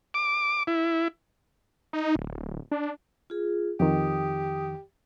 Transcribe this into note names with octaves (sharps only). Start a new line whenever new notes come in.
D6
E4
D#4
D1
D4
F4 G#4
F2 D#3 G4 D#6